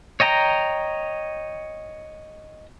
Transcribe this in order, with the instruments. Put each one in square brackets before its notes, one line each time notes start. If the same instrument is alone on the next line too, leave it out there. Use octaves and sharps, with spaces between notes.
[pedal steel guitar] C#5 D#5 G5 A#5